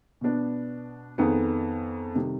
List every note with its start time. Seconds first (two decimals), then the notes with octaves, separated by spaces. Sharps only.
0.21 B2 B3 D4
1.18 F2 D#3 B3 D#4 G#4
2.15 C3 D#3 G3